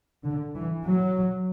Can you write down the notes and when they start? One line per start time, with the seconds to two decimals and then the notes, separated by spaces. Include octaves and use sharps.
0.24 D3
0.54 E3
0.84 F#3